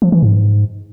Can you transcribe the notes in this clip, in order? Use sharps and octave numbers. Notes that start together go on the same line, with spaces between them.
F3
E3
G#2